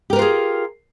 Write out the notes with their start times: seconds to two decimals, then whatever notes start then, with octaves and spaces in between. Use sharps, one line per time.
0.10 G4
0.13 A#4
0.16 B4
0.19 F4
0.22 G#4